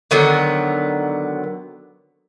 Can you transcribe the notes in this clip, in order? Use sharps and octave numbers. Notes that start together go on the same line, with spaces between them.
D3 D#3 F#3 B3